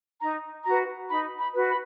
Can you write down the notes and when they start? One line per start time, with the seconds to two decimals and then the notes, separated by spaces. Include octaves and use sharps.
0.20 D#4 A#5
0.65 F#4 B4 A#5
1.09 D#4 B5
1.40 B5
1.54 F#4 B4
1.69 B5